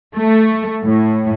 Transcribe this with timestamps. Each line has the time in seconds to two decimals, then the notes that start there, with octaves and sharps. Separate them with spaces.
0.16 A3
0.84 A2